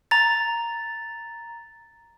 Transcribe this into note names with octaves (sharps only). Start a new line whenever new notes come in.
A#5 A6